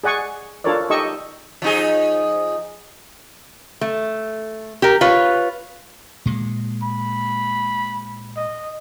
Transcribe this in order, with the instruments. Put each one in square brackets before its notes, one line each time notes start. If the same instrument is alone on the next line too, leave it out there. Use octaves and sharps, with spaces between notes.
[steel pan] G#4 D5 F#5 G#5 C#6
D4 F4 A4 A#4 C#5 D5
D#4 G4 A4 D#5 C#6 E6
[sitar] F3 D#4 G#4
[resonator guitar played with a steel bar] A3
G4 A#4
F4 B4 C#5
[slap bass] A#2 G#3
[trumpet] B5
D#5